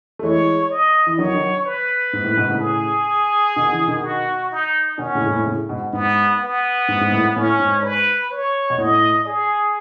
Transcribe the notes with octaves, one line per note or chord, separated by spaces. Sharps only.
A3
E3 G#3 C#5
D#5
E3
D#3 F#3 C#5
D#3 F#3
B4
G#2
A2
G#2 B2
A2 C#3
G#4
B2 D#3
C#3 E3
B2 D#3
F#4
D#4
B2 D#3 C#4
A2 C#3
G#2
A2
A2 C#3
G#2 B2
G#2 B3
B3
G#2
G#2
A2
A2 C#4
G#2
B4
C#5
B2
A2 D#5
G#4